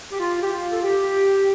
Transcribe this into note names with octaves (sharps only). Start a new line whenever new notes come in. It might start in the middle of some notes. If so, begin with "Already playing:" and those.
G4
F4
G4
F4
A4
G4